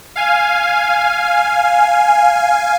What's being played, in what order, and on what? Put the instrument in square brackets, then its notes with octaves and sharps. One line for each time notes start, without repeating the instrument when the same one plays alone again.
[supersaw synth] F5 G#5